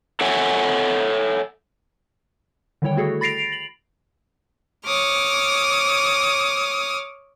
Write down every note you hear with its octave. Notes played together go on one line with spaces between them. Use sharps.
A4 C#5 E5 F#5 G#5
D3 D#3 G3 E4 C#5 G5
A3 E4 F#4 G#4 A4
B5 A6 A#6 C7 D7 F7
F#7
C#5 D6 D#6 F6